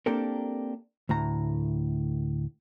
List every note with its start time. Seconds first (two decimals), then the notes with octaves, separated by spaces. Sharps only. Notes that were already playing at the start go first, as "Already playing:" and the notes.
0.06 A#3 C4 D4 G4 A4 A#4
1.09 D2 A2 A#5